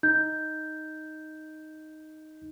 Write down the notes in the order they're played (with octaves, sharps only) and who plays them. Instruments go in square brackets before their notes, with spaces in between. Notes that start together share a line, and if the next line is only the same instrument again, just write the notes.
[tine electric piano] D#4 [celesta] G6